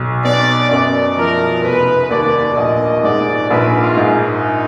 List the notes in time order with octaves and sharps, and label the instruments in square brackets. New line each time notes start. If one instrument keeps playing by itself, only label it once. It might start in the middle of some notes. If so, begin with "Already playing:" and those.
Already playing: [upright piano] B1
[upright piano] B2 [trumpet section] D5
[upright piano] F#2 [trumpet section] D5
[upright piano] F3 [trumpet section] A#4
[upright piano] F1 [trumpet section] B4
[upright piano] D#2 [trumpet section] D5
[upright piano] A#1 [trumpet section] D#5
[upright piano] G#2 [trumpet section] D5
[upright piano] A#1 [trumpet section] B4
[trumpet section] F4
[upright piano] G#2
[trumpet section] D#4